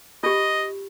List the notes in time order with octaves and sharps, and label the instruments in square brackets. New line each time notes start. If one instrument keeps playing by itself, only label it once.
[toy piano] F4 G4 [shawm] D#5